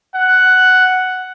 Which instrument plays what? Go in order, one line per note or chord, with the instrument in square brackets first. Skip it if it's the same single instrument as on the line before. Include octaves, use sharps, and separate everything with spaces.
[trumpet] F#5